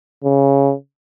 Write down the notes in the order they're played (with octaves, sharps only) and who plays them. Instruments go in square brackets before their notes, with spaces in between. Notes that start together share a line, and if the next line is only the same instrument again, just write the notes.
[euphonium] C#3